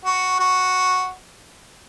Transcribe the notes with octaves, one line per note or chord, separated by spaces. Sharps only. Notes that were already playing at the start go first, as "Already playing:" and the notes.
F#4
F#4